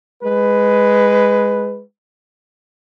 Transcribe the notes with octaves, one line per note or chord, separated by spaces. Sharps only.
G#3 B4